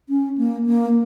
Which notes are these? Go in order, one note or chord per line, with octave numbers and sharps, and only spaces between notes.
C#4
A#3
A#3